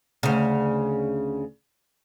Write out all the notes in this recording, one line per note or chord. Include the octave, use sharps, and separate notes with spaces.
D2 C#3